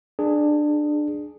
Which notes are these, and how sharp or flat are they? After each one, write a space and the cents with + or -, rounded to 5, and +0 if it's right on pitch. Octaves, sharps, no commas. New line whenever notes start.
D4 +20 G#4 +0